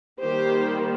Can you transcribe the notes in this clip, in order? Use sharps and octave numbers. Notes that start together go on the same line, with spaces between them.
D#3 G3 A#3 G4 C5